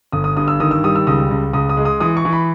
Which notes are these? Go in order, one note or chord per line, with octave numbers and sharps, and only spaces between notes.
G1 D#6
D#6
G2 D#6
E6
D#3 D#6
E6
G3 D#6
E6
C#2 D#6
C#2
C#2 D#6
D#6
G#3
D#6
E3 D#6
C#6
E3
B5